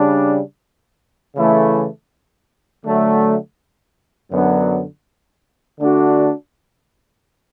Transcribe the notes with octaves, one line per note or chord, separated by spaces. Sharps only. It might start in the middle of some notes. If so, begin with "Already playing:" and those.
Already playing: C#3 G3 D4
C#3 E3 A3 E4
D3 F#3 A3
F#2 D3 F#3 B3 D4
D3 A3 D4 F#4